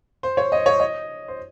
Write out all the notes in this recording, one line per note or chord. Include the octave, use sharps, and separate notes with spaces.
C5
C#5
D#5
C#5
D#5
C5